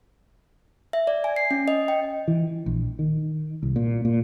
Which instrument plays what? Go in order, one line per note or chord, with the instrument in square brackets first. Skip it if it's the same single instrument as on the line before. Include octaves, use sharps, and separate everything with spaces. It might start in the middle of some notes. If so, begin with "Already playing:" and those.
[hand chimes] E5
D5
G#5
C7
C#4
D#5
G5
[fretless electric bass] E3
A#1
D#3
C2
A#2
A#2